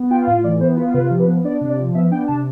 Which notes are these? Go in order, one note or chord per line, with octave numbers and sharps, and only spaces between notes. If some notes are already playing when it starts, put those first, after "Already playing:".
Already playing: B3
F4 G5
A2 F5
E3 D5
B3 C5
F4 B4
C3 B4
F3
B4
B3
D4 D5
C3
D5
F3
B3 E5
D4 G5
C3 A5